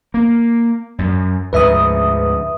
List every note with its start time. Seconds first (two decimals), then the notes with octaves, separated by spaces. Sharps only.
0.14 A#3
0.99 F#2
1.53 D2 G#2 F3 B4 E5 D#6